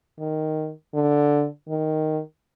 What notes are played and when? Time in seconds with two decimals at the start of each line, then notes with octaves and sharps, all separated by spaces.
0.19 D#3
0.94 D3
1.68 D#3